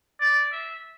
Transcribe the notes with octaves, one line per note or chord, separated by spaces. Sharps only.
D5
E5